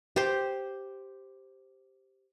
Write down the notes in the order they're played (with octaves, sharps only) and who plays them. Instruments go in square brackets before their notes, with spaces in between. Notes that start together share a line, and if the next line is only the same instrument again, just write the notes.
[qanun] G4 C5